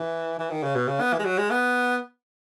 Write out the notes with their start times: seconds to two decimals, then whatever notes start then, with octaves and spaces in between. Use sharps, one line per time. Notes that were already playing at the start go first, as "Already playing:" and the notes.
Already playing: E3
0.39 E3
0.50 D#3
0.63 C#3
0.75 B2
0.88 C#3
1.00 B3
1.13 E3
1.19 G#3
1.25 F#3
1.38 G#3
1.50 B3